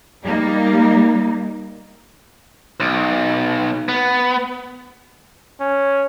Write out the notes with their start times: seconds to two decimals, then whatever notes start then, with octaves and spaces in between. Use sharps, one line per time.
0.24 G3 A#3 D#4
2.80 B1
3.89 B3
5.60 C#4